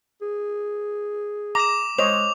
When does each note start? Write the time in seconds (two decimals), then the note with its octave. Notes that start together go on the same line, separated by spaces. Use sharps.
0.21 G#4
1.55 A#5 D6 E7
1.98 G#3 C5 C#5 D#5 F7